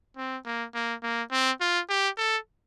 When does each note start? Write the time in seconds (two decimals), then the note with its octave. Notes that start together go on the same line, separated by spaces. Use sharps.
0.17 C4
0.46 A#3
0.74 A#3
1.03 A#3
1.31 C4
1.61 F4
1.89 G4
2.17 A4